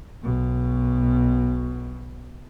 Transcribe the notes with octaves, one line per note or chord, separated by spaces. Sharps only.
B1 B2